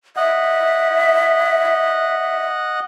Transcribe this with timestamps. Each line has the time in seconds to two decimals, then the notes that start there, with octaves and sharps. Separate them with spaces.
0.17 D#5 E5 F#5